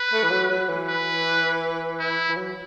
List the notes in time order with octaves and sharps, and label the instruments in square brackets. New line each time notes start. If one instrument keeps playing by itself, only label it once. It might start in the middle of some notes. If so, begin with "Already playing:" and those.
Already playing: [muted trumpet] B4
[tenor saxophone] A3
E3
F#3
F#3
E3
[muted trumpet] B4
E4
[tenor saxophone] E3
F#3